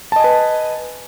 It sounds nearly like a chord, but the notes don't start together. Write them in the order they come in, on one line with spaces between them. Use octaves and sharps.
A5 D#5 G#5 B4